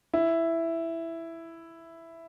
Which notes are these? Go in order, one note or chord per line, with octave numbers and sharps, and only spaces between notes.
E4